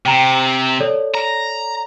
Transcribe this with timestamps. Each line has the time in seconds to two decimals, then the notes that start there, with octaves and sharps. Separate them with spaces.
0.06 C3 G5 A#5
0.80 A4 C#5 D5
1.15 A#5